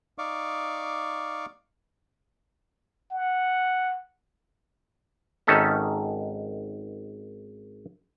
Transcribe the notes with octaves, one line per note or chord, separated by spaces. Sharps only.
D#4 D5 F5 C#6 D6
F#5
G#1 D#3 C#4 D#4 A4 E5